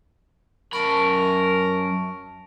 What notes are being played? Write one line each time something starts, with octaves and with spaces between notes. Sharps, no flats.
F#2 A#4 A5 B5 C#6